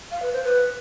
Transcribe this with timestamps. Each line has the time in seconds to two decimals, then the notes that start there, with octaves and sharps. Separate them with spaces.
0.11 F5
0.22 B4
0.33 C5
0.44 B4